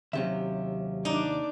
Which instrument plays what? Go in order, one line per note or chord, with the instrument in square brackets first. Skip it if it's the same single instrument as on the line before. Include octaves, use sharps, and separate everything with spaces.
[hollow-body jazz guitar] D#2 C3 C#4 [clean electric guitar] F#3 G4 E5
[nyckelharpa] D4 D5 [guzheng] D#4